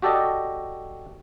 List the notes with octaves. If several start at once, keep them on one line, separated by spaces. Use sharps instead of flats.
F#4 G4 A4 D5 D#5